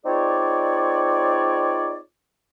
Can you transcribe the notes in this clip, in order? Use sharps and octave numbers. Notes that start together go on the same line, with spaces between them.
C4 D#4 F4 G#4 C#5 D5